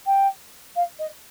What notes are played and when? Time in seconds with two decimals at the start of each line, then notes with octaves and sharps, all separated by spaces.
0.06 G5
0.76 F5
0.99 D#5